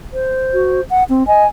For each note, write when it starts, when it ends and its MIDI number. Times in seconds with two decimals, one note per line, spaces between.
0.13 0.82 72
0.54 0.81 66
0.90 1.04 78
1.09 1.26 60
1.27 1.44 75
1.27 1.47 80